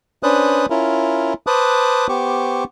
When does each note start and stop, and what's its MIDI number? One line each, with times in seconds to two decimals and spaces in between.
0.23 0.66 61
0.23 0.66 62
0.23 0.66 71
0.23 0.66 72
0.23 0.66 87
0.23 0.66 90
0.70 1.34 61
0.70 1.34 64
0.70 1.34 65
0.70 1.34 70
1.47 2.07 71
1.47 2.07 72
1.47 2.07 81
1.47 2.07 86
1.47 2.07 87
1.47 2.07 90
2.09 2.64 59
2.09 2.64 67
2.09 2.64 72
2.09 2.64 85
2.09 2.64 86